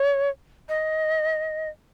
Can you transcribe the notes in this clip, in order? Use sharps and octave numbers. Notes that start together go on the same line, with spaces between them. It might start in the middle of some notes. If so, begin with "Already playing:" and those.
Already playing: C#5
D#5